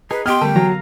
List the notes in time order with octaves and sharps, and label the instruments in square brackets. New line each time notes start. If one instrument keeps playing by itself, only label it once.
[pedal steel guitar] D#4 G#4 [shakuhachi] B4
[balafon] B3 G4 [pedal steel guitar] D#5 C6 [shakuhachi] G5 [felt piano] F6
[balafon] D3 A#4 A5 [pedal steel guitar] G3 A3 G4
[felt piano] F#3 [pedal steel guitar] F5 A#5